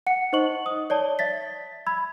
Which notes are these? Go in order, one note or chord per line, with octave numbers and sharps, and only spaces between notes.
F#5 C#7
D#4 C5 D#5 C#6 F#7
D#6
C#5 D5 A5 G7
E5 A6 B6
B5 E6 G#6